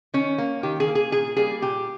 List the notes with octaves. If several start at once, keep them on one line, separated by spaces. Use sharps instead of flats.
D#3 C#4
A#3
D#3 G4
G#4
A#3
G#4
A#2 G#4
G3 A#3 G#4
A#2 G4